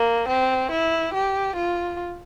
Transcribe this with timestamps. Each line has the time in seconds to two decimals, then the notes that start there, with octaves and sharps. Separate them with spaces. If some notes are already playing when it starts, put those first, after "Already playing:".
Already playing: A#3
0.29 C4
0.71 E4
1.14 G4
1.56 F4